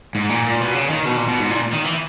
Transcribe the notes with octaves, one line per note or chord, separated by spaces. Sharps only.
G#2
A#2
A#2
B2
C#3
D#3
B2
A#2
B2
G#2
A#2
D#3
E3